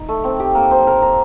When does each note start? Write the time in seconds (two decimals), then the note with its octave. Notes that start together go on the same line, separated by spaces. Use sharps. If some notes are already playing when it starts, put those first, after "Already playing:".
Already playing: D#4
0.09 A3
0.24 C4
0.40 G4
0.55 A#3
0.71 C5
0.87 A#4
1.02 A#4